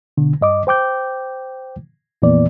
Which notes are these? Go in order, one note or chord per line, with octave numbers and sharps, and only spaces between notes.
B2 D3
G2 D#5 D6
C5 G5 D6 G6
F2 A#2 E3 A#3 B3 D5